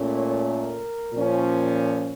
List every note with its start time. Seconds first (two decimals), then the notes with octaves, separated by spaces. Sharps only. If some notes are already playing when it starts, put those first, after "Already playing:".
Already playing: A#2 A3 C#4
0.09 C#5
0.44 A#4
1.12 A#2 F3 C#4